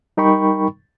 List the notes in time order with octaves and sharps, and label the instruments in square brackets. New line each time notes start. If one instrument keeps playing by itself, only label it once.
[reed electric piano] G3 D#4 A#4 G5 B5 C#6